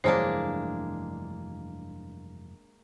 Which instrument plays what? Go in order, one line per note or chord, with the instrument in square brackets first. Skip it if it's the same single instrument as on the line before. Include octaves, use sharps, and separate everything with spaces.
[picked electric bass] F1 G2 E3 [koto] G#3 A#3 D4 [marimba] C5 C#5